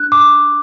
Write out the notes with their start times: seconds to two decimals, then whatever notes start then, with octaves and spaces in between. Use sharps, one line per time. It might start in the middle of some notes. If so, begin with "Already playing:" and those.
Already playing: D4 F#6
0.12 D6